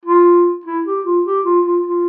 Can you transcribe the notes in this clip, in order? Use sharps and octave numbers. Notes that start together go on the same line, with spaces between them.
F4
E4
G4
F4
G4
F4
F4
F4